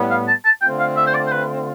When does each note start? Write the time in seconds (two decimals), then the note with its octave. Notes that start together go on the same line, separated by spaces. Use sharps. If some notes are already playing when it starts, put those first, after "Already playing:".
Already playing: A2 G3 B3
0.10 F5
0.28 A5
0.45 A5
0.62 D3 A3 C4 F4 G5
0.80 F5
0.97 E5
1.07 C5
1.14 D5
1.27 C5
1.32 B4